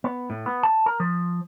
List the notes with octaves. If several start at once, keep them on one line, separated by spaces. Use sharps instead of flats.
B3
A2
B3
A5
A#4
F3